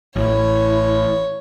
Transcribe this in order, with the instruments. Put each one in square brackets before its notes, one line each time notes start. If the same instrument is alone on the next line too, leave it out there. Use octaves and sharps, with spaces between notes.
[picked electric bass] A1 [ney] E4 [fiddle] C#5